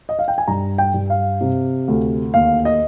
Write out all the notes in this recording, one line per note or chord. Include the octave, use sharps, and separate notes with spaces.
D#5
F5
G5
G#5
G2 A#5
G5
G2
F5
C3
D2
D#2 F5
D#5